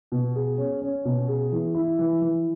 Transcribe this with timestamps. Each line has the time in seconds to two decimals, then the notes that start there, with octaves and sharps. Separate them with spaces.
0.12 B2
0.35 G#4
0.58 C#4
0.82 C#4
1.05 B2
1.28 G#4
1.52 E3
1.75 E4
1.99 E3
2.21 E3